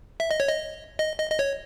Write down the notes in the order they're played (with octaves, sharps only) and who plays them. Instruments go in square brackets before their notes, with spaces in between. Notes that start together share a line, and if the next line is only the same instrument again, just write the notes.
[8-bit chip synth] E5
D#5
C#5
D#5
D#5
D#5
D#5
C#5